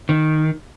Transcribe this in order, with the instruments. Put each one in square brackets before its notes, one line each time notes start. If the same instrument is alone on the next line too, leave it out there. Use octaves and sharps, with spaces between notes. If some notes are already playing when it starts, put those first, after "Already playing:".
[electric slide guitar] D#3